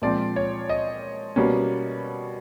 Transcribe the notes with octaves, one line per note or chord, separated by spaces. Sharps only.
A#2 F3 G#3 C4 D5
C#5
D#5
B2 G3 A#3 C#4